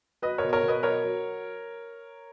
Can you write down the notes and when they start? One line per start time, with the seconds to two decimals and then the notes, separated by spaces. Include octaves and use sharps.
0.22 F#3 B4 D#5
0.38 A#4 C#5
0.43 B2
0.53 A#4 C#5
0.63 B2
0.68 B4 D#5
0.83 F#3 A#4 C#5
1.04 F#3